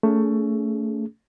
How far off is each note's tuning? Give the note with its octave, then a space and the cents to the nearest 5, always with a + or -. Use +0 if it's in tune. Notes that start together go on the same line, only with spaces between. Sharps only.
A3 +20 C#4 +40 G#4 +20